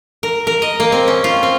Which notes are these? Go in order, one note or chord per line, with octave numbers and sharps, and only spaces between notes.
A#4
A#4
D#5
A#3
C4
C#4
F4
C4